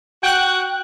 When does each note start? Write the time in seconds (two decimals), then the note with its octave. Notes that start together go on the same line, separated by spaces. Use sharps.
0.23 F#4 G5 F#6